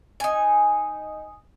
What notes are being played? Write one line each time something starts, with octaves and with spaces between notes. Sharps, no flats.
D#4 G#5